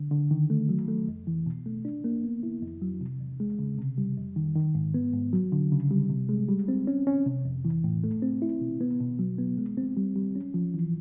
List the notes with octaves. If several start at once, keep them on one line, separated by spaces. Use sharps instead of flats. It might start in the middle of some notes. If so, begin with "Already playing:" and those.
Already playing: D3
D3
D#3
A3
F#3
A3
F2
E3
B2
A3
D4
A#3
B3
E4
F2
F#3
C3
E2
G#3
C#3
C3
G3
F2
D#3
D#3
G#2
B3
G#2
F#3
D3
C#3
G3
C3
G#3
G3
C4
C#4
C#4
C3
F2
E3
A2
A3
C4
E4
B2
B3
B2
F#3
B3
G#3
C4
G3
G3
C#4
F3
E3